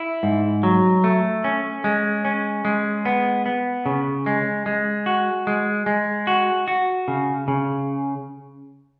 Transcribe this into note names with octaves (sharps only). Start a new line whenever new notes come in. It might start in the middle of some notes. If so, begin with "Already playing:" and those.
Already playing: E4
G#2
F#3
A3
C#4
G#3
C#4
G#3
B3
B3
C#3
G#3
G#3
F#4
G#3
G#3
F#4
F#4
C#3
C#3